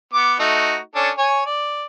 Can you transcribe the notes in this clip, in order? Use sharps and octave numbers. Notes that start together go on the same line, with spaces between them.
B3 D6
A3 D#4 F#4
C#4 D4 A4
C#5 G#5
D5